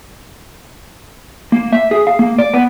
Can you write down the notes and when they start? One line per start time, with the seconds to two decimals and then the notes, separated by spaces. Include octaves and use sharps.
1.52 A#3
1.73 E5
1.91 G#4
2.07 F5
2.19 A#3
2.39 D5
2.54 B3